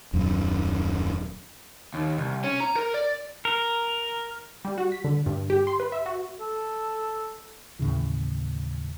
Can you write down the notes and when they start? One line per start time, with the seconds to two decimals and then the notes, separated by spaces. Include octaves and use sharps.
0.13 D#1 F#2
1.94 D#2
2.18 C2
2.44 C#4
2.60 A#5
2.76 A#4
2.94 D5
3.45 A#4
4.65 G3
4.78 F#4
4.92 B6
5.04 D3
5.26 G2
5.50 G4
5.67 C6
5.80 B4
5.92 E5
6.06 F#4
6.41 A4
7.79 D#2 A2 C#3 E3